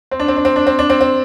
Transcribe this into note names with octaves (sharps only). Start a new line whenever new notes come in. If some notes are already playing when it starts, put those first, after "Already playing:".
C4
D4
C4
D4
C4
D4
C4
D4
C4
C4